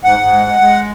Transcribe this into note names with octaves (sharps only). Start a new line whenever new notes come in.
G#2 F#5
G#2
G#3
G#3
G#3